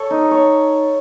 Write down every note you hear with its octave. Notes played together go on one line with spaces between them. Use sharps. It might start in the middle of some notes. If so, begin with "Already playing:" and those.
Already playing: A4 C#5
D#4
A4 C#5